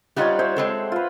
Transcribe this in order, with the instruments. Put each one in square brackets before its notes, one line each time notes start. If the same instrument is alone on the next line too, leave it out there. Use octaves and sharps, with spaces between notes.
[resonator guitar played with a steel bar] G3 D#4 F4 [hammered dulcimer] C#5 F#5
[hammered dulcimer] C5 C#5 E5
[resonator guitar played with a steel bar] G#3 C4 A4
[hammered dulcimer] F4 B4